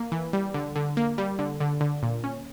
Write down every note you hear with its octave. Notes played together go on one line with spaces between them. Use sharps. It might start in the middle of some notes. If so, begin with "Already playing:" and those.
Already playing: A#3
E3
G3
D3
D3
A#3
G3
D3
D3
D3
A#2
C#4